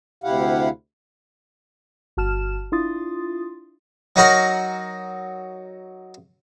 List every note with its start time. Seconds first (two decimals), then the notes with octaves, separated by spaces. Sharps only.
0.24 D2 C3 E4 G4 F5 F#5
2.17 G1 F#4 A5 F6 E7
2.72 D4 E4 F4 C6 D#6 A6
4.16 F#3 D#4 F#4 A#4 A#5